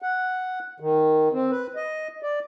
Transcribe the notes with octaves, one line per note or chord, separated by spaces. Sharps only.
F#5
D#3
C4
B4
D#5
D5